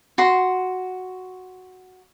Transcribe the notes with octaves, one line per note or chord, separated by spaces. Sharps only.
F#4 C6